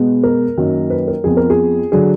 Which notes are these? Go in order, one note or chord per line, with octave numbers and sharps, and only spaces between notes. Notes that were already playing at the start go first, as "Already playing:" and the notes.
Already playing: B2 G#3 B3
A#4
F#2 D#3 F#3 A#3
B4
A#4
F2 F3 B3 G#4
A#4
G#4
D3 F#3 G#4